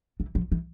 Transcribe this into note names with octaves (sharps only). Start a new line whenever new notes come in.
E3
F3
E3